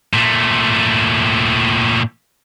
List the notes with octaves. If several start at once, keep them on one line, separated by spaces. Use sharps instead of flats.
A#2 A3